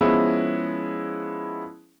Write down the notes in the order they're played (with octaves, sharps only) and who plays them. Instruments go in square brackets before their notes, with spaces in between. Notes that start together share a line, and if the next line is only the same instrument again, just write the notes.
[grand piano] F3 G#3 B3 C#4 E4